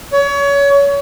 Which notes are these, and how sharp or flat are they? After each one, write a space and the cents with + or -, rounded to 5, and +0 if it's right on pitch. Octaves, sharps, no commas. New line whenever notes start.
C#5 +25